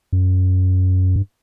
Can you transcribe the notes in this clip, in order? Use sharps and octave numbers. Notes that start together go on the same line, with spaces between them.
F#2
G2